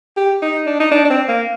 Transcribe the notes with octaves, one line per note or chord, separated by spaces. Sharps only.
G4
D#4
D4
D#4
D4
D4
C4
A#3